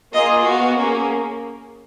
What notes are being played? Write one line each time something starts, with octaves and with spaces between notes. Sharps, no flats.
A#3 F4 G#4 D#5
B3 F#4 F5
A#3 C#4 G#4